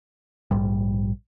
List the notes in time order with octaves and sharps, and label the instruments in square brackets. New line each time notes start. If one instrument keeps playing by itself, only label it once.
[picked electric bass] A#1 G#2 G3